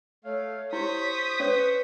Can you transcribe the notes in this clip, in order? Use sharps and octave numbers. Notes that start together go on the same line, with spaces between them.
A3 C#5 F5
E4 G4 C5 C#6 D#6 G6 B6
C#4 B4 C#5